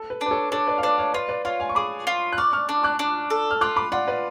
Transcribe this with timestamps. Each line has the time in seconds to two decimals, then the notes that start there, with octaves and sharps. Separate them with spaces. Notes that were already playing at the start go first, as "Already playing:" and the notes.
Already playing: A4
0.10 B4
0.21 D4
0.26 B4
0.31 A4 C#5
0.52 D4 A4 C#5
0.67 B4 D5
0.78 F5
0.83 D4 B4 D5
0.98 C#5 F5
1.14 F4 B4 D5
1.29 B4 D5
1.45 F4 C#5 F5
1.60 F5 G#5
1.69 C#6
1.75 G#4 B5 D6
2.07 F4
2.33 F#6
2.37 D5 C#6 F6
2.53 C#6 F6
2.69 D4
2.83 D6 F#6
2.99 D4
3.30 A4
3.51 F6
3.61 F4 D6 F#6
3.76 B5 D6
3.92 F4 D5 F#5
4.07 B4 D5